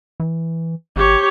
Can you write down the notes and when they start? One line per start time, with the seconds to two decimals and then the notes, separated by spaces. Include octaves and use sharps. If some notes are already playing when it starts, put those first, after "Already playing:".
0.20 E3
0.96 G#1 G4 C#5